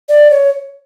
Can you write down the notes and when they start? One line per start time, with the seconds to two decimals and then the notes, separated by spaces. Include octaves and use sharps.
0.09 D5
0.31 C#5